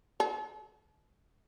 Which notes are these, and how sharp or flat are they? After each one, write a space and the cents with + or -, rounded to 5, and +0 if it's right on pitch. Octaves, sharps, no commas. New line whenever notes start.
A4 -40